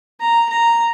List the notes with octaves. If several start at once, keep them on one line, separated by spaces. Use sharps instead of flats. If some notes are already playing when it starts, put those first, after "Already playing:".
A#5
A#5